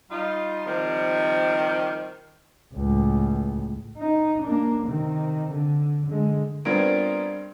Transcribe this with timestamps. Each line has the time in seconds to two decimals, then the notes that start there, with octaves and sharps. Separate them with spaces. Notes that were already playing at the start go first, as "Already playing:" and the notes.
0.10 G3 D#4 F4
0.65 C3 D#3 F3 G3
2.75 C#2 A2
3.98 D#4
4.43 A#3 D4
4.86 C3 D#3
5.50 D3
6.06 D3 G#3
6.65 G2 B3 C4 F4 A#4 D5 G#6 D7